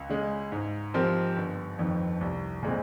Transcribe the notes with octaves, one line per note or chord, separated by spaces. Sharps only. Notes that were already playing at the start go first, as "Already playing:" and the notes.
Already playing: C#2
C#3 G#3
G#2
F3 C4 G4 A#4
G1
F2 D#3
C2
A#2 G#3 C4